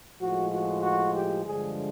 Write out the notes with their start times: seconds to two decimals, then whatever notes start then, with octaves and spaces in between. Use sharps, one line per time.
0.21 A2 F3 G#3 F#4
0.52 F#4
0.82 F#4
1.14 G4
1.44 G2 D3 F3 G#3 G#4